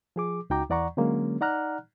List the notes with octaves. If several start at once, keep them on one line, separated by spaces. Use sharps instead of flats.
F3 G#4 D6
C#2 D#4 F#4 G5 A#5 D6
E2 E3 D5 F#5 A#5 C#6
D3 F#3 G#3 A#3 C#4
D#4 D5 F#5 A#5 F6 F#6